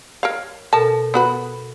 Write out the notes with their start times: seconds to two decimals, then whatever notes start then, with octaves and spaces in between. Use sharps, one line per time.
0.23 A#4 C#5 F5
0.73 B2 A4 A#4 A5
1.14 B3 F#4 B4